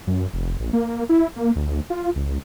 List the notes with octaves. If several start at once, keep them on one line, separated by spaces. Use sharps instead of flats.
F#2
F1
A#1
A#3
E4
A#3
D2
F4
C#2